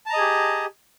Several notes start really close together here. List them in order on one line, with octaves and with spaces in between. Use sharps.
A5 A#5 D#5 G#4 G4